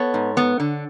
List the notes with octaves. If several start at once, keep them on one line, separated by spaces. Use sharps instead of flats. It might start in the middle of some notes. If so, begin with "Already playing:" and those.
Already playing: B3 A4 C#5
G#2
B3
D3